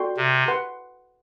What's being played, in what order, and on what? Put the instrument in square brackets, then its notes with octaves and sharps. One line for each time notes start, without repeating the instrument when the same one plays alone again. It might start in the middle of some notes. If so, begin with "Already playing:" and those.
Already playing: [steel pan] F#4 A4 D5 G5 C6
[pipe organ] C3
[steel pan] B4 F#5 C6